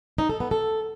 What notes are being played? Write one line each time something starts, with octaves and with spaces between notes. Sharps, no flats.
D#4
A4
B3
A4